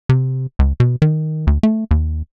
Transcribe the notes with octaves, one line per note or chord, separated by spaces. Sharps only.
C3
C#2
B2
D#3
D2
A3
D#2